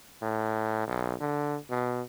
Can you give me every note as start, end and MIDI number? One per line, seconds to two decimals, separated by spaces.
0.22 0.83 45
0.87 1.14 35
1.20 1.57 50
1.70 2.02 47